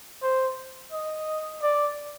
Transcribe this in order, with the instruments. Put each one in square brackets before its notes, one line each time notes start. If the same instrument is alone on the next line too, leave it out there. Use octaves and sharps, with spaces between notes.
[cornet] C5
D#5
D5